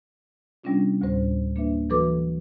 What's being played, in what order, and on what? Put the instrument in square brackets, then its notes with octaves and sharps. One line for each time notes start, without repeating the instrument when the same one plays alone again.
[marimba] C3 G3 B3 C#4 D4 F4
D2 A2 G3 C5
A#3 D4 B4 E5
E3 F#3 F#4 A4 B4 D6